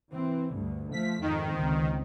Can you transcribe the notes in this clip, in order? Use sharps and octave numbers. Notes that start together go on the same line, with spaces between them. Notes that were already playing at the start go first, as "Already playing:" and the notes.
E3 C4
D2 G2
F3 A3 B6
F2 G#2 D#3
G1 C#2 C4